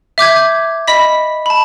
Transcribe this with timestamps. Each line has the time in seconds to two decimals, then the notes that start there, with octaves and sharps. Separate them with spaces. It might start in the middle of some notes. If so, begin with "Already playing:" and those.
0.18 E5 D6 G6 G#6
0.87 D#5 B5 B6
1.46 A5 B5